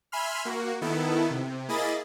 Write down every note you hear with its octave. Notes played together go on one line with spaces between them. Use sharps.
E5 G#5 B5 C6 F6
A#3 F#4
D#3 B3 E4 A4
C3
A#3 E4 G#4 D#5 B5 A6